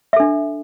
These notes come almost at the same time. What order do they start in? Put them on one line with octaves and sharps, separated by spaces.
E5 A4 D4